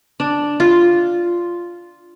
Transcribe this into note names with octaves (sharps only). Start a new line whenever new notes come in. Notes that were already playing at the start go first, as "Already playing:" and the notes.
D4
F4